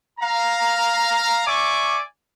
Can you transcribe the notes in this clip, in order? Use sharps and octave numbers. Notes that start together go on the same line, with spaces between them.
F5 A#5
D5 E5 G#5 C#6 D6